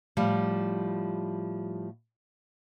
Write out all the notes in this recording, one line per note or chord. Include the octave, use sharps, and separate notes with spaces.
A2 F3 G3